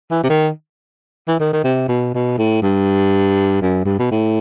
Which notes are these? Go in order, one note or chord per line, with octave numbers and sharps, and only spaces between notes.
E3
C3
D#3
E3
D#3
D#3
C3
B2
B2
A2
G2
F#2
G2
B2
A2